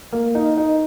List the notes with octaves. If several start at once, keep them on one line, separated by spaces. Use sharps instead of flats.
A#3
D#4
D#4